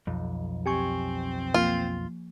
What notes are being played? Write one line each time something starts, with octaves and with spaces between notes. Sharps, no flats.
B1 F2
C4 G4 G#5 C#6
F3 A#3 F4